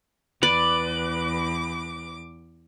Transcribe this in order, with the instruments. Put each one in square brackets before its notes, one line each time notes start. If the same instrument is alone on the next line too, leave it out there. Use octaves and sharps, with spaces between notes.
[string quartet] E2 D6 [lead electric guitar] B4 [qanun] D5